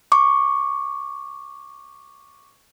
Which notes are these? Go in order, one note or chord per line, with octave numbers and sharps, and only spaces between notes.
C#6 D6